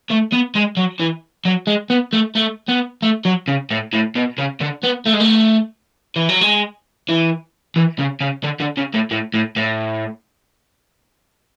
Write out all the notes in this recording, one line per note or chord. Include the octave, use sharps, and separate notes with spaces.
A3
B3
G#3
F#3
E3
F#3
G#3
B3
A3
A3
B3
A3
F#3
C#3
A2
A2
B2
C#3
D3
B3
A3
G#3
A3
E3
F#3
G#3
E3
E3
C#3
C#3
D3
D3
C#3
A2
A2
A2
A2